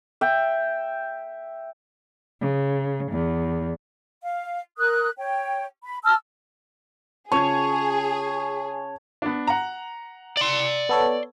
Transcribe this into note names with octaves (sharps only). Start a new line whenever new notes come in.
E5 G5
C#3
E2
F5
A#4 D#6 F#6
C#5 G5
B5
A5 E6 F6
C#3 F4 G#4 C#5 A5 G#6
B3 D4
F#5 A#5
D5 C6
B3 A4 C#5